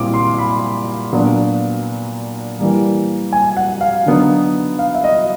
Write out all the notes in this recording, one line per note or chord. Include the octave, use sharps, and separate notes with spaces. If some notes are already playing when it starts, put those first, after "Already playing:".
Already playing: A#2 G3 C4 E4 D6
C6
B5
A#2 F#3 B3 D4
E3 G3 A#3
G#5
F#5
F5
D3 F#3 B3 D#4
F5
E5
D#5